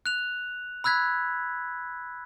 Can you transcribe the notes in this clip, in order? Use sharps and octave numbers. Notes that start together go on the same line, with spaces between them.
F#6 F7
B5 E6 F#6 G#6 B6